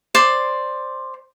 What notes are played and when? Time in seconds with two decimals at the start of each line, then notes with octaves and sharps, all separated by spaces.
0.15 C5 D5 C6